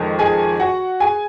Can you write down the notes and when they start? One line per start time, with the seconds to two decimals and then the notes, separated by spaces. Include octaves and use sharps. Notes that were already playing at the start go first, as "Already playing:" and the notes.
Already playing: F2 D#3 G#3
0.19 G#4 G#5
0.60 F#4 F#5
1.00 G#4 G#5